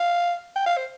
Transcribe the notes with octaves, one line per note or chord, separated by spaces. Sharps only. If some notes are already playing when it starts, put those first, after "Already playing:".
Already playing: F5
G5
F5
C5